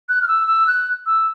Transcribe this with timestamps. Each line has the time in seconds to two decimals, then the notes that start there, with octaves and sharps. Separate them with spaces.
0.09 F#6
0.22 F6
0.28 E6
0.47 E6
0.67 F#6
1.06 E6